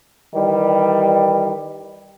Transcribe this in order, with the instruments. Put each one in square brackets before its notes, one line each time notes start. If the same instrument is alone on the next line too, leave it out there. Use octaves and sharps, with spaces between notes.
[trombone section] D#3 E3 G3